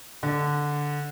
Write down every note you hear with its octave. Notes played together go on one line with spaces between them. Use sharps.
D3